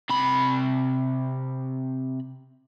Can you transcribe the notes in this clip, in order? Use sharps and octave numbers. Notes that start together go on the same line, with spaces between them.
C3 B5